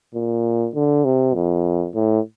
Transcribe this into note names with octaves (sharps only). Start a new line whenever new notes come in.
A#2
D3
C3
F2
A2